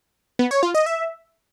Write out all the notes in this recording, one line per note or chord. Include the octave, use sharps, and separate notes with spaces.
B3
C#5
F4
D#5
E5